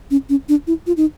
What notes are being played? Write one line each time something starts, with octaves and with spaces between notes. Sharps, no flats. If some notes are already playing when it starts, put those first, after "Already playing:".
C#4
C#4
D4
E4
F4
D#4